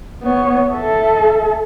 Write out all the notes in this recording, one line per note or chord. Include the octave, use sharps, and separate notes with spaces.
B3 C#5
A4 E5